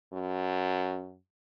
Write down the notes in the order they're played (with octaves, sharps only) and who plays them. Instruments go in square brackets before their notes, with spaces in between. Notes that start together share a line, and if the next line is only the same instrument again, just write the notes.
[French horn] F#2